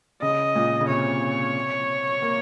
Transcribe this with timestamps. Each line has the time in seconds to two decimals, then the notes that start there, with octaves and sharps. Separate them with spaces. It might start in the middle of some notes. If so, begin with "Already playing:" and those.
0.22 C#3 D#5
0.55 A#2
0.81 C#3
0.88 C3 C#5
2.22 A#3